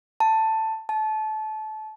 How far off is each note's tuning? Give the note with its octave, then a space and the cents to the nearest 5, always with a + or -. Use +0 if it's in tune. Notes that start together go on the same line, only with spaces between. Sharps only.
A5 +10
A5 -25